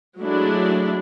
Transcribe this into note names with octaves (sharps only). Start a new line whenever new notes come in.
F#3 G#3 A3 D4 E4